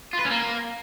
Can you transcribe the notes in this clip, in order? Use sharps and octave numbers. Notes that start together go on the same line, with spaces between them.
F4
B4
C#4
A#3